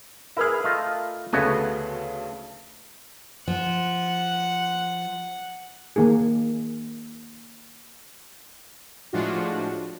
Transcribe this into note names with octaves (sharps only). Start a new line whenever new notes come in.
E4 G#4 A#4 B4 F6
A3 F4 D#5
D2 C#3 A3 B3 F#4 G#5
F3 F#5
D#3 A#3 D#4 G#4
A2 F3 G#3 D4 F4 F#4